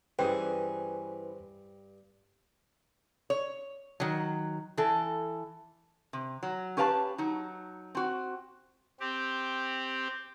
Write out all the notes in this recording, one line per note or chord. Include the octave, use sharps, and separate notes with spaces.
G2 E3 C#4 G#4 B4 C5 G5
C#5
D#3 F#3
E3 A4
C3
F#3
C#4 G4 B4 F5 F#5 A5
F#3 D#4
C4 F#4
C4 G4